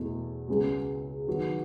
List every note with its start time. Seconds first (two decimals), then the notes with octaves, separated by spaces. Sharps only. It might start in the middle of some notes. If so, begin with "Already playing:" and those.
Already playing: E2 B2 A3
0.48 C#2 C#3 G#3 B3 F#4
1.28 D#3 F#3 B3 F#4